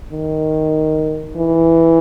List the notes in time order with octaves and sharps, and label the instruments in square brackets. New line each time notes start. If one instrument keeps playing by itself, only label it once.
[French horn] D#3
E3